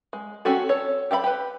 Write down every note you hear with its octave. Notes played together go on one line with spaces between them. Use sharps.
G#3
C4 C#4 F#4 A4
A4 C#5
G4 A4 E5 B5
G4 B4